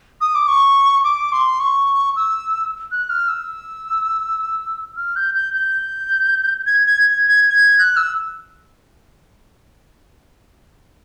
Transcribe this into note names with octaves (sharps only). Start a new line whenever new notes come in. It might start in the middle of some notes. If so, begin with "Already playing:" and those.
D#6
D6
C#6
D6
C6
C#6
E6
F#6
F6
E6
F6
G6
G6
G6
G#6
G#6
G#6
G#6
G#6
F#6
E6